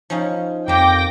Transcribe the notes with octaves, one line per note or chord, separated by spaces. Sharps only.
F3 C#4 D#4
F2 A#3 G4 G5 D6 A#6